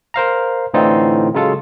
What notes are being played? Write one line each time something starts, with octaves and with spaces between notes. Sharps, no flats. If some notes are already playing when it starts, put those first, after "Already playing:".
A#4 C5 F5 A#5
A2 D3 E3 C4 D#4 F4
C#3 F#3 G#3 F4 A4